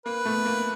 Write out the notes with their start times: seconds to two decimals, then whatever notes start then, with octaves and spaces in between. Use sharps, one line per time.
0.06 A#3 B4
0.26 A3 B3
0.45 A#3